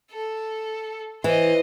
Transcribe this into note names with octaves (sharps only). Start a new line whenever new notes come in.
A4
E3 C5 D#5